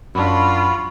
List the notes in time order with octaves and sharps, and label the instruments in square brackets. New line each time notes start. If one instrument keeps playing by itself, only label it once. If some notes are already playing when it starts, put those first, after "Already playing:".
[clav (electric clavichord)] F#2 D4 [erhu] F4 [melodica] F#4 [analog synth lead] B5